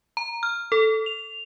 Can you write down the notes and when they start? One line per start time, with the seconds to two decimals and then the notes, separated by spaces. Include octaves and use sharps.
0.17 A#5
0.43 F6
0.72 A4
1.06 F7